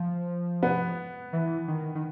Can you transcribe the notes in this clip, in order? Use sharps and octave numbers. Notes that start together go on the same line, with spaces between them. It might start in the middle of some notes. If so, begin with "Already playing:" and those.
Already playing: F3
B3
E3
D#3
D#3